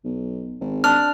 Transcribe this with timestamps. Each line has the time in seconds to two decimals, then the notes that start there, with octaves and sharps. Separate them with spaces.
0.05 B1
0.61 G#1
0.84 D4 F6